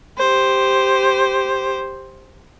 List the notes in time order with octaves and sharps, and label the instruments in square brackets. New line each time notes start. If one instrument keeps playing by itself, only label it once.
[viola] G4 C5